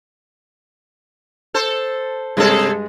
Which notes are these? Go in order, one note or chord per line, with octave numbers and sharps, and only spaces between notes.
A4 C5
G2 C3 G#3 G#4 A4